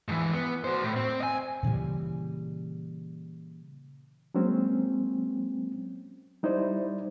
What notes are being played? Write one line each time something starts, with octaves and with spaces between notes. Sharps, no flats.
G#2 E3
B3
F#4 C5
A2
C4
D#5 G#5
A#2 C#3 E3 G3
F#3 G#3 A#3 C4 C#4
G3 D#4 E4 C5 D5